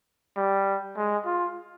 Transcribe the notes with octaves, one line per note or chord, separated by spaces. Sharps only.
G3
G#3
F4